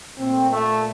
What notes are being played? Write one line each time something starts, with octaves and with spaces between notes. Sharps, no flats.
A#2 A3 C4
A3